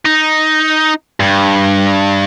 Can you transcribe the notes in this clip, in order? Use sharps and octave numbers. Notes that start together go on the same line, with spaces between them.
D#4
G2